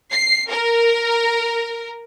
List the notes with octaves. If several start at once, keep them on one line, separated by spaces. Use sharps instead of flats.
C7
A#4